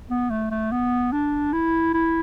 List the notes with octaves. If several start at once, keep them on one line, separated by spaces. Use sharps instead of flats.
B3
A3
A3
B3
D4
E4
E4